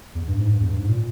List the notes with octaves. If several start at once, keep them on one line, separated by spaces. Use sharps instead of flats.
E2
G2
G#2
G2
E2
G2
G#2
A#2